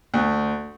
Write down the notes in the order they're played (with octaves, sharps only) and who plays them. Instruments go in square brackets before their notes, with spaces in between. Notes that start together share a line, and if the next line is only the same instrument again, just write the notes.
[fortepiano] D2